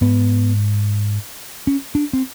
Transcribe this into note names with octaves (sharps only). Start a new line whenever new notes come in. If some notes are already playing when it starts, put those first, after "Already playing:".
G#2 B3
C#4
D4
C4